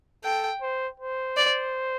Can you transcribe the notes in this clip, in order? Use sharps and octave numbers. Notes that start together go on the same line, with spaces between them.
A4 G5
C5
C5
D5